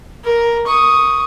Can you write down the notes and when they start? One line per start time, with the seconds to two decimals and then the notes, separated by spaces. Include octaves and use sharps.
0.24 A#4
0.67 C#6 D#6